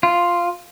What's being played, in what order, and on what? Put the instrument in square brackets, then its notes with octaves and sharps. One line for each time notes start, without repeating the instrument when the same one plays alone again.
[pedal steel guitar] F4